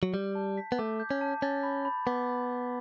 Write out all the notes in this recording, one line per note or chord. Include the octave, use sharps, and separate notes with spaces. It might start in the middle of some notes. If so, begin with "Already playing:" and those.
F#3
G3 G6
A5
B6
B3
A3 D6
G6
C#4
A5
C#4 A6
B5
B5
B3 D6